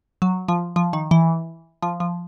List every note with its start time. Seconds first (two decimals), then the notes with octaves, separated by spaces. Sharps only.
0.22 F#3
0.48 F3
0.76 F3
0.93 D#3
1.11 E3
1.82 F3
2.00 F3